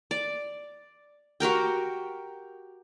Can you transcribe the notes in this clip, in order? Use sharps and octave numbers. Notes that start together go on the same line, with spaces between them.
D5
F#4 G4 A#4 G5